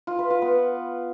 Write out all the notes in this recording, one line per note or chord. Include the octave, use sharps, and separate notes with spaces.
F4
B4
F4
B3